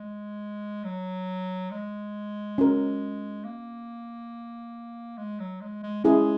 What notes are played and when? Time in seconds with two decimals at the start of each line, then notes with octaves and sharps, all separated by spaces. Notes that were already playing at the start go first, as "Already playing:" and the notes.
Already playing: G#3
0.85 F#3
1.71 G#3
2.58 C#4 F#4 A#4
3.45 A#3
5.18 G#3
5.40 F#3
5.61 G#3
5.83 G#3
6.04 G#3 C#4 E4 G#4